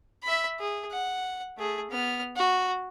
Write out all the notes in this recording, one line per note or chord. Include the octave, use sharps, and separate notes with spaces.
E5 B5
G#4
F#5
A3 G#4
B3 F6
F#4